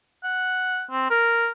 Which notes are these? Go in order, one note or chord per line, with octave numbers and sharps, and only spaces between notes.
F#5
C4
A#4